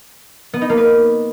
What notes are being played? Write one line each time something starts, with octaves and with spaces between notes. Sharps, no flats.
B3
D#4
A#3
B4